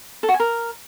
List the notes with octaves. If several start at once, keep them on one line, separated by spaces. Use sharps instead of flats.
A4
F#4
G#5
A#4